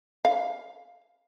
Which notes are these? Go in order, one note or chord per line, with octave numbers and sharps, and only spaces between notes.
F5